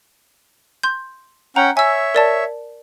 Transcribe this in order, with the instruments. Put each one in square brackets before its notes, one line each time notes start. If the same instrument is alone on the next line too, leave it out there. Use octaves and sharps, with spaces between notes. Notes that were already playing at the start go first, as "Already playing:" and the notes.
[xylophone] C6 G6
[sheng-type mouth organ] C#4 F#5 G5 [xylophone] A#5
[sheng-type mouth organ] C#5 E5 [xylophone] G#5 E6
[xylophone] A#4 D5 A5